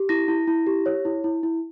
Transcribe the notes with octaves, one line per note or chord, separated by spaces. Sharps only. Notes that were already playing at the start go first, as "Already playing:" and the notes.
Already playing: G4
E4 A#6
E4
E4
G4
C#5
E4
E4
E4